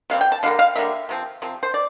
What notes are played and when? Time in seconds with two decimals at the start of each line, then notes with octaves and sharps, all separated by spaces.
0.10 C3 E3 G3 C4 F5
0.21 G5
0.32 A5
0.43 D3 G3 A#3 F5
0.59 F5
0.76 D3 G3 A#3 E5
1.09 C3 F3 C4
1.42 C3 F3 C4
1.63 C5
1.74 D5